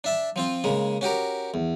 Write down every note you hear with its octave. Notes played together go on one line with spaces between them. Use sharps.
D4 E5 A5
F3 C4 F4
C#3 G#3 A#3
C#4 F#4 G4 A#4
E2